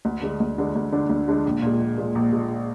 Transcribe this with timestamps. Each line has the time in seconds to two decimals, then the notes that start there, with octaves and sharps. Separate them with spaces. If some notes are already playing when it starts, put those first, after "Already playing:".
0.05 D2
0.22 D3 G#3 D4
0.40 D2
0.58 D3 G#3 D4
0.75 D2
0.92 D3 G#3 D4
1.10 D2
1.28 D3 G#3 D4
1.45 A#1
1.62 A#2 G#3
1.80 A#1
1.98 A#2 G#3
2.15 A#1
2.33 A#2 G#3